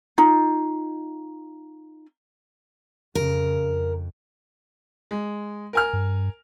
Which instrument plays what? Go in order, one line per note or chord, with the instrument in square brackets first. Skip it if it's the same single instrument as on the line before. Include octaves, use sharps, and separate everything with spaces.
[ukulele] D#4 F4
[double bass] F2 C#3 [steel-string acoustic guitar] A#4
[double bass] F2
[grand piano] G#3
A#4 G#5 F6
[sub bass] G2